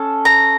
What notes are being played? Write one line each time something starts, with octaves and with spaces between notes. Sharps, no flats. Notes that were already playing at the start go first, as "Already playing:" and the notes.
Already playing: C#4 A4
A#5